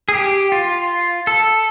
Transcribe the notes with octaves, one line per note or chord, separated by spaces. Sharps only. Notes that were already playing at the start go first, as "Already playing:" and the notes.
G#4
G4
F4
A4